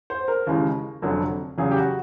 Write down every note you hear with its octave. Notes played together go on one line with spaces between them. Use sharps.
C5
A#4
D#2 C#3 E3 G#3
F1 F2 D3 F#3
E2 C#3 F#3 G#4
G4
F#4